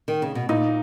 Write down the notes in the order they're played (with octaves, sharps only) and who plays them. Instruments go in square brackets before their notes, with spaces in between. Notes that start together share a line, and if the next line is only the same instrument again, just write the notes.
[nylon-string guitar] D#3
C#3
B2
[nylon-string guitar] A#2 [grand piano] D#4